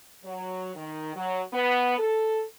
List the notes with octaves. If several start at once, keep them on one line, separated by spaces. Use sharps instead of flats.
F#3
D#3
F#3
B3
A4